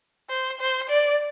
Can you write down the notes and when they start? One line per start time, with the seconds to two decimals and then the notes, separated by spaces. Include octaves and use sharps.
0.29 C5
0.60 C5
0.89 D5